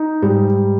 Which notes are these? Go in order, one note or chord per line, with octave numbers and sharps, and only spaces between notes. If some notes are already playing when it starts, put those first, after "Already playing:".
Already playing: D#4
G#2 G3